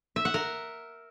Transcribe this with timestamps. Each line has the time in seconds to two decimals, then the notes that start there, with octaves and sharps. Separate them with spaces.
0.16 E5
0.25 F#5
0.34 A#4